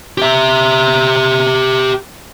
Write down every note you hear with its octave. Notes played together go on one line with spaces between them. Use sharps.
G4 E5